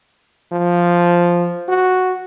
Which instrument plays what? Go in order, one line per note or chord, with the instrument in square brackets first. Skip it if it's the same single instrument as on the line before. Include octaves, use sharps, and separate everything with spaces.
[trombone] F3
F#4